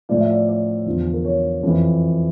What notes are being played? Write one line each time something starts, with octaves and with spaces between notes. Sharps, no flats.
A2 F3 D5
E5
D5
D5
E2 D3 F3
A#4
C#5
F2 E3